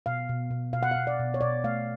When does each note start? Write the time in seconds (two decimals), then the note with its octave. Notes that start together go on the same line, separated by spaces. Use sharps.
0.06 B2 F5
0.29 B2
0.51 B2
0.73 B2 F5
0.83 F#5
0.91 B2 F5
1.07 D5
1.19 B2
1.34 C#5
1.41 B2 D5
1.64 A3 F5